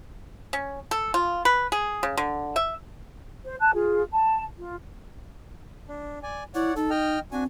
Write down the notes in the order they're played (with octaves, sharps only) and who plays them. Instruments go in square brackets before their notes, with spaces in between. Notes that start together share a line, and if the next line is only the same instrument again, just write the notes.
[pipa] C#4
A4
F4
B4
G#4
C#3
D3
E5
[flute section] C5
A5 F#6
F4 G#4
A5
F4
[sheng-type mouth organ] D4
D5 G#5
[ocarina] E4 [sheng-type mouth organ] C#5 D5 F#5
[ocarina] D#4 [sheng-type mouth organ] A4
[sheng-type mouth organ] D#5 G5 F6
[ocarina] C4 [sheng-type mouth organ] D4 F#4 G#5